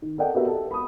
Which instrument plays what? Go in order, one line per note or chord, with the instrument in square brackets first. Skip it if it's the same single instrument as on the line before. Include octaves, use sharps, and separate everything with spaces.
[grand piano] D#3
A4 A#4 D5 D#5 F#5 G5
B3 F#4 G4 A#4 B4 E5
A4
B5 D#6